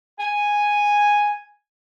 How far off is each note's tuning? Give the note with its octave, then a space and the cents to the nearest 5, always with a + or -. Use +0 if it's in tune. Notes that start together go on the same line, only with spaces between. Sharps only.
G#5 -5